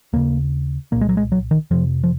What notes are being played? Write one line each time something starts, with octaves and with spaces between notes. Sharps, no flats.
D#2 C#3 A#3
C2 A#2 A#3
G#3
F#3
G#3
F#3
D#3
F2 C3 F3
F3